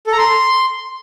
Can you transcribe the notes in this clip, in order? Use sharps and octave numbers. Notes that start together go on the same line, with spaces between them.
A4
A#5
C6